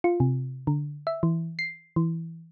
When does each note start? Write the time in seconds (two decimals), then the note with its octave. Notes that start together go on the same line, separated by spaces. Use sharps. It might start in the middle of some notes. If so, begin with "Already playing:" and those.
0.04 F4
0.20 C3
0.67 D3
1.07 E5
1.23 E3
1.59 C7
1.96 E3